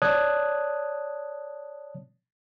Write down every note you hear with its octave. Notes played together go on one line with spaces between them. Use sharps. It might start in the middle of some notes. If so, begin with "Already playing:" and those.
C#5 D5 A5 D#6 F#6 G#6